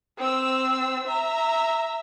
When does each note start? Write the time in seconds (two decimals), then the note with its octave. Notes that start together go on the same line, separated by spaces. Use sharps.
0.18 C4 E6
1.08 E5 A#5